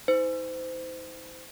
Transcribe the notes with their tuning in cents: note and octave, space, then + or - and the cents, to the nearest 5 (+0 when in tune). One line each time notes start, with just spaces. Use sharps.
D#4 +40 C5 -30